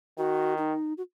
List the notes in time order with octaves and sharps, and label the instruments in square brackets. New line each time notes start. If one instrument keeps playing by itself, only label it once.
[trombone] D#3 [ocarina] F#4
[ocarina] D#4
F#4